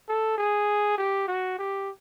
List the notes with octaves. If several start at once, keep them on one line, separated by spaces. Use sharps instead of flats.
A4
G#4
G4
F#4
G4